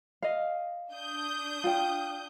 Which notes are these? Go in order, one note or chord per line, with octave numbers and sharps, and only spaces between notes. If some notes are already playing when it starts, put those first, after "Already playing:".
D#5 F5
D4 D#6 G6
F4 G5